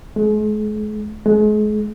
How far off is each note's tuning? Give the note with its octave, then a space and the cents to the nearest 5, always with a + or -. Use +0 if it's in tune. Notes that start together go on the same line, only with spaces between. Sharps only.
G#3 +40
G#3 +35